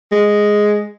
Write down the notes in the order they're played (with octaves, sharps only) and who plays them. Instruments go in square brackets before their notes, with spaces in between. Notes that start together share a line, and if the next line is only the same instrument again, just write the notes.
[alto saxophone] G#3